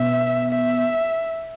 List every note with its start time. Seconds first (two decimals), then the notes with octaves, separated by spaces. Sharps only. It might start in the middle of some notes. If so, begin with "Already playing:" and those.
Already playing: B2 B3 E5
0.51 E5